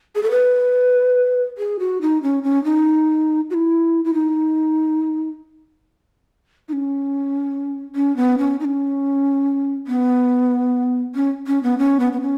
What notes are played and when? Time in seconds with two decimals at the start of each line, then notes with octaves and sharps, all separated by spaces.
0.15 G#4
0.23 A4
0.31 B4
1.58 G#4
1.79 F#4
2.01 D#4
2.23 C#4
2.43 C#4
2.64 D#4
3.50 F#4
3.54 E4
4.05 E4
4.14 D#4
6.68 D#4
6.73 C#4
7.96 C#4
8.17 B3
8.38 C#4
8.60 D#4
8.65 C#4
9.87 B3
11.15 C#4
11.47 C#4
11.63 B3
11.78 C#4
12.00 B3
12.13 B3
12.21 C#4